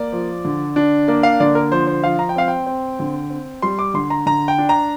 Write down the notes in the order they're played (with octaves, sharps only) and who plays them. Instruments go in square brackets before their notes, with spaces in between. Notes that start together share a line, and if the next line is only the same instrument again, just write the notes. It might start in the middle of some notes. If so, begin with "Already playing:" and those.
Already playing: [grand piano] A#3 D5
F3
D3
D4
A#3 D5
F5
D3 D5
A#4
F3 C5
C5
F3 F5
A#5
G5
C4 F5
G5
C4
D3
C4
G3 C6
D6
D3 C6
A#5
D3 A#5
G5
D4
A#5